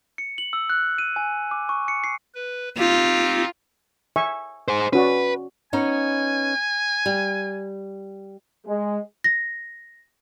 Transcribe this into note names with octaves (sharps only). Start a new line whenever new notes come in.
C#7
F#7
E6
F#6
D#7
G#5
D6
C#6
C#7
C7
B4
C4 D#4 F4 G4
E5 G#5 C#6
G#4 C5
C#4 F#4 B4 D5
B3 C#4 D#4 G#5
G3
G#3
A#6